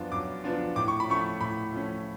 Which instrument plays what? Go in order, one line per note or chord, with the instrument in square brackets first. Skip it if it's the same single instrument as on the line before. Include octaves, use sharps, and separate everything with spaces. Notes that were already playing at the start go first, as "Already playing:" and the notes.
Already playing: [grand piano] F#2 F3 B3 D4 F4
F#2 D6
F3 B3 D4 F4
A2 D6
C#6
B5
F3 A3 C#4 C#6
A2 B5
F3 A3 C#4